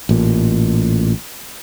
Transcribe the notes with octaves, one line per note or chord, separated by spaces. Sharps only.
A1 A#2